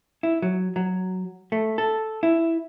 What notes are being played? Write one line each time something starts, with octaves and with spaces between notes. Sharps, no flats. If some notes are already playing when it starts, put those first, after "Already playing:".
E4
F#3
F#3
A3
A4
E4